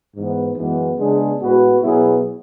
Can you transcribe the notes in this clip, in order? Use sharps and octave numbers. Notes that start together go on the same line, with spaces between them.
G#2 E3 B3
F#2 E3 G#3 B3
C#3 G#3 B3 D4 G#4
A2 G#3 B3 F#4 B4
B2 F#3 B3 E4 G#4